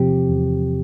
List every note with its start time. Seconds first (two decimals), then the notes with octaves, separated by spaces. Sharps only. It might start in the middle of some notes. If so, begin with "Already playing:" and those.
Already playing: E2 C3 F3 C4 G4
0.29 E2